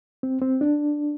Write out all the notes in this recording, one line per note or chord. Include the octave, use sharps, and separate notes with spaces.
C4
C4
D4